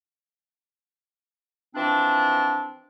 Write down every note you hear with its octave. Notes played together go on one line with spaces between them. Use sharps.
E3 F3 C4 D4